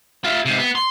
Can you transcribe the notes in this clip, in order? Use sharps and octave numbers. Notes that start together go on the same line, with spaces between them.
F4 E5
G#2 C3
B3
C6